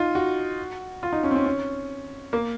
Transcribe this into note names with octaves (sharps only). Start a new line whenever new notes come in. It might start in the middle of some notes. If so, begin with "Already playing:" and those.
Already playing: D#4 F4
F#4
F4
D#4
C#4
C4
C#4
C#4
A#3